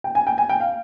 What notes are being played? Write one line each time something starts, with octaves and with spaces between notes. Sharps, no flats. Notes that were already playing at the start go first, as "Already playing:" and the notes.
G5
G#5
G5
G#5
G5
F5